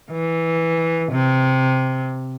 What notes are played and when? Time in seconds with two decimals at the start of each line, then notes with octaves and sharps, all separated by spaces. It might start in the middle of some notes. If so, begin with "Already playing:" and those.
0.12 E3
1.12 C3